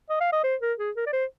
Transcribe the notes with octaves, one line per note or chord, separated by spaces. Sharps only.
D#5
F5
D#5
C5
A#4
G#4
A#4
D5
C5